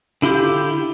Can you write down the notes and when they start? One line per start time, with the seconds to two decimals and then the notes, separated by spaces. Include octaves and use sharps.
0.22 D3 E4 F4 G4